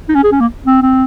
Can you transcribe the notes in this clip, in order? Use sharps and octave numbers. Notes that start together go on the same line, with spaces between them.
D#4
C#4
G#4
C#4
A#3
C4
C4